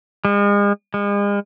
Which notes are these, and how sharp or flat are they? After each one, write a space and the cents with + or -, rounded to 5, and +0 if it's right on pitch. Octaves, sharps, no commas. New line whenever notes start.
G#3 -40
G#3 -40